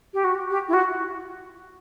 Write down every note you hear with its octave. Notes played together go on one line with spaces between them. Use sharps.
G4
F#4
G4
G4
E4
F#4